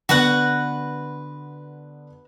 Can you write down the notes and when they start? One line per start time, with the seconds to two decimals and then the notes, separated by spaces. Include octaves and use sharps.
0.09 D3 B3 F#4 B4 F#5